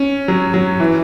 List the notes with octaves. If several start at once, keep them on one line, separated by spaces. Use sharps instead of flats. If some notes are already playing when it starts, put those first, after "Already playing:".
Already playing: C#4
F#3
F#3
E3